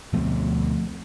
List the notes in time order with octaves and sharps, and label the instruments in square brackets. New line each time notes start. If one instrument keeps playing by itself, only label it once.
[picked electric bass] D2 B2 [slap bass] F3 A3 C4